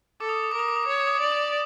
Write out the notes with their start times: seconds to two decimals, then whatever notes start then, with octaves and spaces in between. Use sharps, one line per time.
0.20 A4 D6
0.29 D#6
0.36 D6
0.44 D#6
0.51 A#4 D6
0.59 D#6
0.68 D6
0.76 D#6
0.83 D6
0.87 C#5
0.92 D#6
1.00 D6
1.07 D#6
1.15 D6
1.20 D5 D#6
1.32 D6